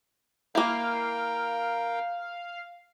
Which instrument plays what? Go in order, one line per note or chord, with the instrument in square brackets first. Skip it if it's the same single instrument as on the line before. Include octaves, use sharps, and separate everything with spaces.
[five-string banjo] A#3 E4 [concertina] A#4 G5 [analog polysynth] F5